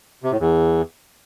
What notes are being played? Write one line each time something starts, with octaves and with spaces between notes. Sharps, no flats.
C3
A2
E2